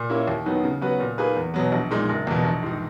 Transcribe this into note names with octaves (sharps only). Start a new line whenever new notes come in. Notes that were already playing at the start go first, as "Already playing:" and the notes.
Already playing: A#2
A#3 C#4 E4
D#2
D#3 F#3 B3 D#4
C#3
F#3 B3 F#4 B4
A#2
A#3 D#4 G#4 B4
E2
B2 F#3 B3
A#1
A#2 G#3 D#4
F#1
E2 B2
A#1
G#2 D#3